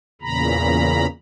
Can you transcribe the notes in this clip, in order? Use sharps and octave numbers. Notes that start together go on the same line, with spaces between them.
E2 A#2 C#3 A#5 B5